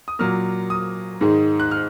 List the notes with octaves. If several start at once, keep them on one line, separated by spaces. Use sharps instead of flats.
D#6
A#2 F#3 A#3 F6
D#6
G#2 D#3 G#3
F#6
F6